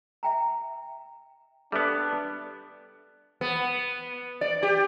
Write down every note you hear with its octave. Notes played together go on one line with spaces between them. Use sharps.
E5 G5 A#5
G3 B3 D4 A4 E5
B3
D5
G4